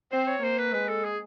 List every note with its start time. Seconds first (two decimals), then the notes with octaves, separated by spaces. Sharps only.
0.12 C4 C5
0.27 C#5
0.43 A#3 C5
0.58 B4
0.73 G#3 B4
0.89 A4
1.04 G#4